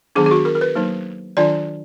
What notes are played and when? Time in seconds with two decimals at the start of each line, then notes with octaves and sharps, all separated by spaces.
0.15 D#3 F#3 B3 D4 G#4
0.26 G#4
0.31 F#4
0.45 A#4
0.55 A#4
0.61 B4
0.75 F#3 A#3 D#4
1.37 D#3 F#3 D4 F4 D5